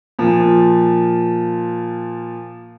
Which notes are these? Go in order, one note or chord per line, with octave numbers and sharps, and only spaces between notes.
A#2 F3